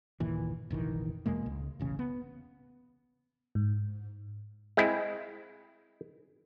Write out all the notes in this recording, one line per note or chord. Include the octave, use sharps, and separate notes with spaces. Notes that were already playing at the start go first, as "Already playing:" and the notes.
G1 D#2 A#2 E3
F1 A#1 D#3 E3
E2 B2 G#3 A#3
C#2
E1 A1 C#3
B3
G#2
G#3 C4 E4